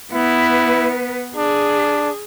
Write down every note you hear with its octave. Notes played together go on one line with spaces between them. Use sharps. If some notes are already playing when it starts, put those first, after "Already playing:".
B3 E4 B4
D4 G#4